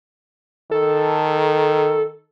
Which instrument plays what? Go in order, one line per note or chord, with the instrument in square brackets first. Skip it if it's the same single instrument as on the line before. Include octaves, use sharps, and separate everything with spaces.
[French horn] D#3 [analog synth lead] A4